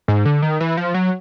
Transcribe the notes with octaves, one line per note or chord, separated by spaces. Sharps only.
G#2
D3
D#3
E3
F3
F#3